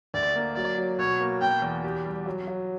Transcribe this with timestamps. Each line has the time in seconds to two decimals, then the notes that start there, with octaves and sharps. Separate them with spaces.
0.14 D2 D5
0.36 A#3
0.56 F#3 D5
0.78 F#3
0.98 B2 C#5
1.20 A#3
1.41 B2 G5
1.62 E2
1.84 G4
2.05 G3
2.26 F#3
2.47 F#3